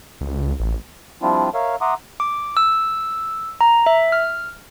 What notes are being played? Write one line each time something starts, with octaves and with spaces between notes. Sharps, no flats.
C#2
A1
F3 G3 C4 D4 E4 F4
A#4 C#5 E5 F5
E5 F#5 A#5 C6 D6 D#6
D6
E6
A#5
E5
F6